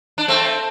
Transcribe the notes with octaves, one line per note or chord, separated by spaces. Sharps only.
D4
A3 C4